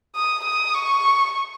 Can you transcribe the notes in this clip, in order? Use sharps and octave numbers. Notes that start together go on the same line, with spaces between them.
D#6
D#6
C#6